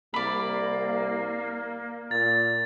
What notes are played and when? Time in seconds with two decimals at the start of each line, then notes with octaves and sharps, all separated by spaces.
0.14 C2 A#3 D5 B5
2.11 A#2 A6